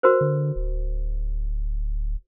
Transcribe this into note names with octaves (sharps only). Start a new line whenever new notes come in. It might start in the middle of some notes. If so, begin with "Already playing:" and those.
F#4 A#4 C5
D3
D1